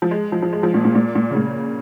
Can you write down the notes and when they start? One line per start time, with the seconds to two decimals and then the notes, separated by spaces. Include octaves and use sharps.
0.02 F3
0.11 G#3
0.32 F3
0.42 F3
0.53 G#3
0.63 F3
0.74 A#2
0.85 A#2
0.95 A#2
1.15 A#2
1.31 C#3
1.36 A#2